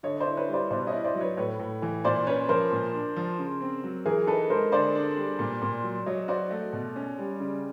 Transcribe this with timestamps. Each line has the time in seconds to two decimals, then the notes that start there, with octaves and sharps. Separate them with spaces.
0.03 D3 C#5 D#5
0.20 C5 D5
0.26 E4
0.37 B4 C#5
0.49 G3
0.54 C5 D5
0.70 B2 C5 D5
0.87 C#5 D#5
0.92 E4
1.04 C5 D5
1.15 F#3
1.21 B4 C#5
1.37 A2 B4 C#5
1.59 A2
1.82 E3
2.04 A#2 C5 D5
2.27 C#4 B4 C#5
2.49 F3 A#4 C5
2.72 A#2
2.94 D4
3.16 F3
3.39 C#3
3.61 C4
3.84 F#3
4.06 E3 G#4 A#4
4.27 D#4 A4 B4
4.50 G#3 A#4 C5
4.72 D3 C5 D5
4.95 D4
5.17 G3
5.39 A#2
5.62 A#2
5.83 F#3
6.06 F#3 C#5 D#5
6.28 F#4 C5 D5
6.51 A3
6.73 B2
6.96 C#4
7.18 G3
7.40 C#3